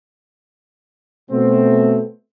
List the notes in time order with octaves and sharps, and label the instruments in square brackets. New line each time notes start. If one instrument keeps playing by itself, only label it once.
[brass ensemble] B2 A3 C4